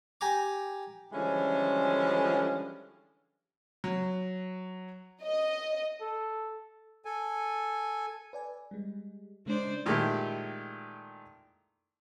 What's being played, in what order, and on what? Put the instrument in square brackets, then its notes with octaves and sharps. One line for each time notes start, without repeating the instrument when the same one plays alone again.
[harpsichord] G4 G#5 A#5 D6
[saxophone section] D3 E3 F3 G3 G#3 C#4
[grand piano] F#3
[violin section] D#5
[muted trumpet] A4
[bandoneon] A4 G#5
[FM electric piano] B4 D5 G#5
G3 G#3
[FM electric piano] C#3 C#4 D4 [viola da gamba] G#3 C5 D5
[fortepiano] A#2 D#3 G#3 A3 E4 G4